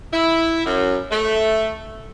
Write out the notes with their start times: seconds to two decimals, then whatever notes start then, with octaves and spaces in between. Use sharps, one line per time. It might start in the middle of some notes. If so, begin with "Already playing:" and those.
0.13 E4
0.66 F#2
1.11 A3